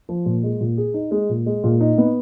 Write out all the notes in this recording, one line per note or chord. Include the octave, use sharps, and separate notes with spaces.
F3
A#2
G#3
A#2
G#4
D#4
G#3
A#2
G#3
A#2
D#4
B3